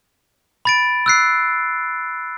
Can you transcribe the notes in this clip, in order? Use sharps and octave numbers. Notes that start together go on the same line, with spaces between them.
B5 A6 D7
E6 F#6 C7